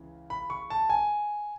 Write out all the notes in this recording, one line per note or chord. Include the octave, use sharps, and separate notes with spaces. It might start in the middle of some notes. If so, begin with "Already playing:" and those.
Already playing: C#2 C#3 E3
B5
C#6
A5
G#5